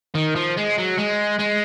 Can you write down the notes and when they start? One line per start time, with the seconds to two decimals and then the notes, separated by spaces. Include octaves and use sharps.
0.15 D#3
0.35 F3
0.57 G#3
0.77 F#3
0.98 G#3
1.39 G#3